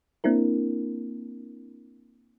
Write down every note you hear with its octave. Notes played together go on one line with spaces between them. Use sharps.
A#3 C4 D4 E4 A#4